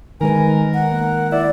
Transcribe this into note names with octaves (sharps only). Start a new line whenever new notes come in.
D#3 G#3 A#4 B4 G#5
F#5
A#3
E4 D5